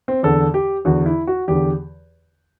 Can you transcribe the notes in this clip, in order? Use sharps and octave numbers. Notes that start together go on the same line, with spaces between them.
C4
E2 D3 A4
G4
E2 D3 F#4
E4
F#4
E2 D3 G4